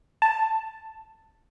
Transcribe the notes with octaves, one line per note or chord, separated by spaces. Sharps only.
A5